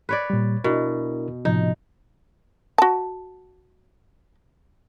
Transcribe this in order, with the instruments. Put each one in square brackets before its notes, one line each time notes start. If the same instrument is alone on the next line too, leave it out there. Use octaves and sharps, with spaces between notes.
[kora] B4 C#5 D5
[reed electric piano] A#2 G3
[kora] B2 [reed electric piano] D4 E4 A#4
[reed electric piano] A2 C3 F3 [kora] D#4
[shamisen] F#4 A5